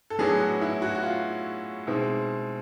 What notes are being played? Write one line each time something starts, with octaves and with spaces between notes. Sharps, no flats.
A4
A2 F#3 B3 D4 G#4
F#4
E4
F#4
F#4
F4
B2 G#3 C4 D#4 E4